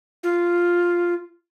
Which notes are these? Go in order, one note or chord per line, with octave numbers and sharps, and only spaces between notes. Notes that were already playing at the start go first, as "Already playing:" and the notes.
F4